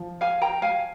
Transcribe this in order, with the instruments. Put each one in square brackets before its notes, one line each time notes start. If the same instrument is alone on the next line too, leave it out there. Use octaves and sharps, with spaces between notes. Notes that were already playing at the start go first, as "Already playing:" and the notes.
Already playing: [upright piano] F3
[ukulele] F5 G#5
G5 A#5
F5 G#5